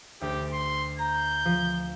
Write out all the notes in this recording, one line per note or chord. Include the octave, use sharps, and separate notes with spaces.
D2 G4
C6
A#5 G6
F3